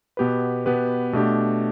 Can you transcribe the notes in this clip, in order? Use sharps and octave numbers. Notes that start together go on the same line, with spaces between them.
B2 B3 G4 B4
B2 B3 G4 B4
B2 A3 D4 G4